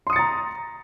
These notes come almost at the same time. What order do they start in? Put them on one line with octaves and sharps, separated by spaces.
C6 D#6 C#7 A6 A#5